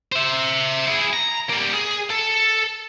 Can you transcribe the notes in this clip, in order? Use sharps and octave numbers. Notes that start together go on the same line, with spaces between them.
C5 E5
E4 G#4
A#5
G3 A#3
G#4
A4